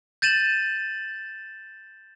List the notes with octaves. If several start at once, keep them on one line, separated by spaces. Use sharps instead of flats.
G6 A6 D#7 E7 F#7